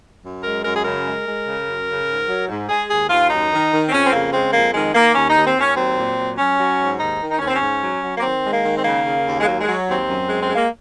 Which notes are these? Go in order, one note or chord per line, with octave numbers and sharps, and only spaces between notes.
F#2
G#3 A#4
F#2 A#4
G#4
C#3 A#4
G#3
G#3
C#3
F#2
C#3
G#2
F#3
G#2
G#3 G#4
D#2 G#4
D#2 F4
F#2 D#4
D#3
D#3
C4
F2 C#4
C4
C#3 A#3
G#3 C4
F2 A#3
D#3 G#3
D#3 A#3
D#2 C#4
D#4
D#2
C4
D#2
C#4
F#3 C4
A#2
F#3
F#3 C#4
F#3
G#2
D#2 D#4
D#3
D#4
D#2 C#4
C4
C#4
G#2
F#3
F#3
A#3
D#3 C4
G#3
A#3
D#3
C4
C#3 A#3
C#3
D#2
G#3
F#3 A#3
G#3
F#3
D#2 C4
F#2
G#3
G#3 C4
A#3